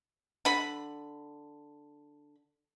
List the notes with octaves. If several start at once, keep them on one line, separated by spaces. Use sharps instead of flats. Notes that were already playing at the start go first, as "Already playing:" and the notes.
D3 B5